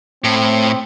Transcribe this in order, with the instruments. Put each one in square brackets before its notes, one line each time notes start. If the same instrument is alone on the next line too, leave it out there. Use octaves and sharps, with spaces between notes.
[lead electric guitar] A2 [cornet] C4